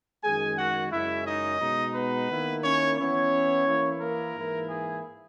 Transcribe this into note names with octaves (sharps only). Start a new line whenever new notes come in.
F#2 D#3 G#3 G#4 G#5
F#4 F#5
F#2 C#3 G#3 C#4 E4 E5
D#4 D#5
B2 G#3 D#4
B3 B4
D#3 A#3 E4
C#4 C#5
E3 B3 C#4 E4 C#5
E3 A#3 E4
A#3 A#4
G#2 E3 A#3 E4
G#4